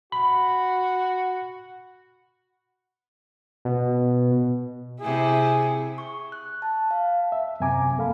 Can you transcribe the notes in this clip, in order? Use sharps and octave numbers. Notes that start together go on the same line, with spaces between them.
F#4 B5
B2
C3 E4 G#4
C#6
F#6
A5
F5
E5
F#2 C3 C4 G#5 A#5 D6
F2 A#3 A4 F5 B5